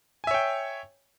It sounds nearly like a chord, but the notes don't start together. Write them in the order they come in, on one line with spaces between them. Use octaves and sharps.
G#5 E5 C#5 G5